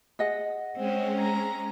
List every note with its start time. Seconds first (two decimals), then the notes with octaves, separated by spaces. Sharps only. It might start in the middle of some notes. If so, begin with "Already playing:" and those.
0.19 G#4 D#5 F#5
0.77 G#3 C4 C#4
1.19 A#5